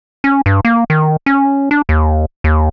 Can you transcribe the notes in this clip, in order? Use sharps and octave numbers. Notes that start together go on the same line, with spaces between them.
C#4
G2
A#3
D#3
C#4
D4
D#2
D#2